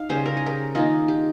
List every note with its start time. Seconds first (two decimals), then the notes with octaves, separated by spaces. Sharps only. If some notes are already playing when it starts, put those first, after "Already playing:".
Already playing: D#4 F5
0.09 C#3 G3 C#4 G#4 C5
0.26 A#4
0.37 G#4
0.46 G4 A#4
0.75 D#3 A#3 D#4 F4 G#4
1.08 G4